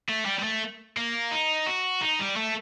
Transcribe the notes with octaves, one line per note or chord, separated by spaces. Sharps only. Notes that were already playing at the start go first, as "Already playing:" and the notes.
A3
G3
G3
A3
A#3
D#4
F#4
D#4
G3
A3